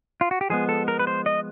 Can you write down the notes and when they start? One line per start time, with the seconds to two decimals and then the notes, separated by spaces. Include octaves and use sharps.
0.21 F4
0.31 F#4
0.41 G4
0.50 F3 G#3 B3 G#4
0.69 A4
0.88 A#4
0.99 B4
1.07 C5
1.26 D#5